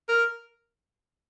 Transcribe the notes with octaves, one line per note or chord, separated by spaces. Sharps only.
A#4